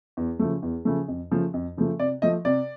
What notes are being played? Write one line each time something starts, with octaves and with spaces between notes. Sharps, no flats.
E2
C#3 F3 A3
E2
C#3 F3 A3
F2
C#3 F3 A3
F2
C#3 F3 A3
C3 D5
F3 A3 D#5
C3 D5